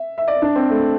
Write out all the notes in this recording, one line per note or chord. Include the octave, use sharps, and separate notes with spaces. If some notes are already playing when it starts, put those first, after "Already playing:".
Already playing: E5
E5
D5
D4
C4
A3